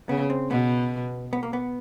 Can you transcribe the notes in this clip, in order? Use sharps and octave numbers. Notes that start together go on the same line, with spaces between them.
C#3 B3
C4
B2 B3
B3
A#3
B3